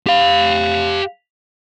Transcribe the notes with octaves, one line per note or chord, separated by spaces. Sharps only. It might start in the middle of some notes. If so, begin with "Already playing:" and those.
G4 F5